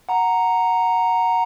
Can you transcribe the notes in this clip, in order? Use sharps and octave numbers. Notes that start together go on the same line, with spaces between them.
F#5 A#5